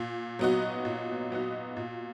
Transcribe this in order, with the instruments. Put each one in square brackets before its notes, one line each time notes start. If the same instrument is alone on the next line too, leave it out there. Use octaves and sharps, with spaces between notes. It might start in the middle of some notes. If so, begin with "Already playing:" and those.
Already playing: [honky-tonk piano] A#2
F#3 B3 D#4 F#4
A#2
F#3 B3 D#4 F#4
A#2